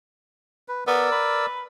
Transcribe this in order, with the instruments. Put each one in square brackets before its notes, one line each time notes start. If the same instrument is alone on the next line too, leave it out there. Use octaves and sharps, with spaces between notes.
[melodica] B4
[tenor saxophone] B3 [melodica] A#4 D5 E6
[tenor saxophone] B4